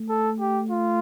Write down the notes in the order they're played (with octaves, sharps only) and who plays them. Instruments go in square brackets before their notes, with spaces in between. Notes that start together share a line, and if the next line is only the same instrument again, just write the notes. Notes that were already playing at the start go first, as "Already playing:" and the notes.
Already playing: [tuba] A3
[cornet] A4
G4
F4